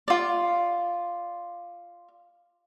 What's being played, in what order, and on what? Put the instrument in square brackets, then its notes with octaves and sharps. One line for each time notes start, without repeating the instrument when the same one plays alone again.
[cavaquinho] F4 D5